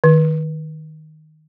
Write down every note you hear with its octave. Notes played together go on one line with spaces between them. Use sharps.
D#3